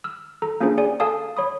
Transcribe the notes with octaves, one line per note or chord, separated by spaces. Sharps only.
E6 F6
A4 A#5
A#3 C#4 D4 F4 G#4 C5
G#4 D5 G#5
A4 F5 G#5 A5 D#6
C#5 B5 D#6